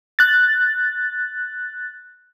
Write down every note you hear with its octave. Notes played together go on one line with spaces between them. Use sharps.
F#6 A6